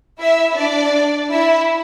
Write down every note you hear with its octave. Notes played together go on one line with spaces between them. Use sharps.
E4 E5
D4 D5
E4 E5